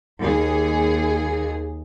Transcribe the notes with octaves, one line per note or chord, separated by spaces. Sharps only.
D#2 G#4